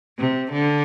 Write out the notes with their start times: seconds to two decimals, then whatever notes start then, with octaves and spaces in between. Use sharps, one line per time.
0.19 C3
0.52 D3